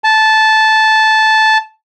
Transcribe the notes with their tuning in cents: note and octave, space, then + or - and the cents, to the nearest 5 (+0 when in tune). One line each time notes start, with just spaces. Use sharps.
A5 -10